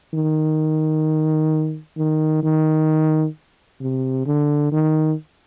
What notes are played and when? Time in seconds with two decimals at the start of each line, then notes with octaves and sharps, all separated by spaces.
0.14 D#3
1.97 D#3
2.43 D#3
3.81 C3
4.26 D3
4.72 D#3